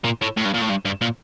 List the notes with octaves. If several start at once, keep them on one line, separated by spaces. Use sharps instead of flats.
A#2
A2
A2
G2
A#2
A2
G2
G2
A#2